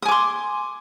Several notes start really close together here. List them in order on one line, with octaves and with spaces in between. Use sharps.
D#6 G#5 D6 C6